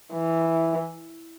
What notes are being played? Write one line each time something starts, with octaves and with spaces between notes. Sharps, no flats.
E3